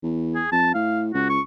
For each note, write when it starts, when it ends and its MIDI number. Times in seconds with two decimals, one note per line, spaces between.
0.03 0.42 40
0.35 0.51 68
0.52 0.74 41
0.52 0.73 81
0.75 1.11 45
0.75 1.02 77
1.14 1.39 37
1.14 1.28 66
1.30 1.41 85